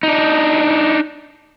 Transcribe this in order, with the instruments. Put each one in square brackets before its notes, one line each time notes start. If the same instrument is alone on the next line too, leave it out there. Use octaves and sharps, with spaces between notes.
[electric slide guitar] D4 D#4